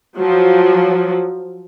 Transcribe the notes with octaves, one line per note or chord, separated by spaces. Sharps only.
F3 F#3